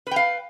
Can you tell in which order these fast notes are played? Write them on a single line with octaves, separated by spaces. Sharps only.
B4 G5 F5